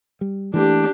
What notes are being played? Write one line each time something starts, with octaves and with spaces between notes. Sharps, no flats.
G3
E3 A3 A#3 D4 G4